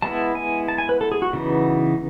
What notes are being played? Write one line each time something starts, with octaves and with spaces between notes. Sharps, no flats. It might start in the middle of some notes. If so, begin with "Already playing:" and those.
G#3 B3 E4 A5
G#5
A5
G#5
B4
A4
G#4
F#4
C#3 E3 B3 D#4